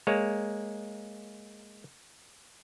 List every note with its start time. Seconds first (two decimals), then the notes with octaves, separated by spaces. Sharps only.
0.07 G#3 A#3 C#5